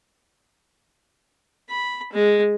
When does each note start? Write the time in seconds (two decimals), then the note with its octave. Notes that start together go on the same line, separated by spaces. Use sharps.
1.70 B5
2.13 G#3